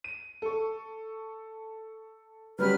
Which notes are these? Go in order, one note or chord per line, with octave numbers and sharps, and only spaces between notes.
D#7
A4 C#6
F#3 G3 C#4 B4 F6